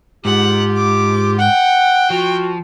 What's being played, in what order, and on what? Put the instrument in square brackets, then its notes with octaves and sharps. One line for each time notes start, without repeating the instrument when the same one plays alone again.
[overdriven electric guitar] G#2 [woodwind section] F4 G4 [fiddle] F#5
[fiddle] D6
[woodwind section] F#5 [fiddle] G5
[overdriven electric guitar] F3 [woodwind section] F#4